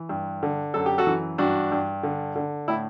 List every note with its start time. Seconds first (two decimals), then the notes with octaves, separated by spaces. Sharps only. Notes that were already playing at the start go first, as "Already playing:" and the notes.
Already playing: E3
0.09 G2
0.43 D3
0.74 F#2 A4
0.86 G4
0.98 F#4 A4
1.07 E3
1.38 G2 D4 F#4
1.72 G2
2.03 D3
2.36 D3
2.68 A2 E4